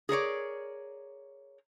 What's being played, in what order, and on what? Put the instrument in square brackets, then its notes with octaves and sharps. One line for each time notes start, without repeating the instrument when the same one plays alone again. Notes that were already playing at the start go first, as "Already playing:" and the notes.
[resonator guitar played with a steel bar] G#4 A#4 C#5 D5